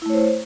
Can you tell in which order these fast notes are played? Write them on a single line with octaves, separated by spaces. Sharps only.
E4 A3 C#5 C5